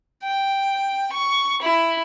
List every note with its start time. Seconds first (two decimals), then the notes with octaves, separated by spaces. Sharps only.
0.23 G5
1.12 C#6
1.62 E4